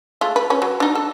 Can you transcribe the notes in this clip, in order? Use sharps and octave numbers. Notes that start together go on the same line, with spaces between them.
G#3 A3 F4
B4
C#4 B4
F#3
D4 D#4
A4